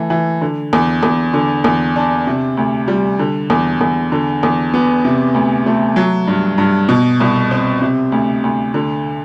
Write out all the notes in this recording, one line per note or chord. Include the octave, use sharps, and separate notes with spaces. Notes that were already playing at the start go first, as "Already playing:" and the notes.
Already playing: E3 A3
E3
D3
E2
E2
D3
E2
D4
C3
D2
G3
D3
E2
E2
D3
E2
B3
C3
D2
A3
F#3
G2
G2
B2
C2
C4
C3
D2
D2
D3